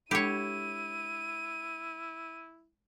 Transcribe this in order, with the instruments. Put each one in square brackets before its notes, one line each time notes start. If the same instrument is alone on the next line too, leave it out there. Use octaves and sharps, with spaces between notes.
[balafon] G#3 D4 A4 [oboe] E4 [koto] G4 C#5 [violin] D#7